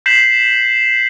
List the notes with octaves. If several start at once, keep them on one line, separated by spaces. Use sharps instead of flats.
G6 B6 C7 E7 F#7